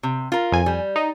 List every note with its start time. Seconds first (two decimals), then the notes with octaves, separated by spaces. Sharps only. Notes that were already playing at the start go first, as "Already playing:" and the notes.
0.03 C3
0.32 F4 A#4
0.52 F2 G#5
0.66 G3
0.96 D#4